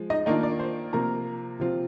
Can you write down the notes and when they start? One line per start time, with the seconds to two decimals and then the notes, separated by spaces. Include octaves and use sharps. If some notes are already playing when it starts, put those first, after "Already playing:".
Already playing: F3 G#3
0.10 D#4 D#5
0.26 D#3 A#3 D4 D#4 F4 D#5
0.43 D5
0.59 C5
0.93 C3 F3 A#3 A#4 A#5
1.60 C3 F3 C4 F4